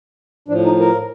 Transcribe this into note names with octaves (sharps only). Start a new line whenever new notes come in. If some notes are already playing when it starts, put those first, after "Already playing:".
A2 F3 D4
D#4
A#4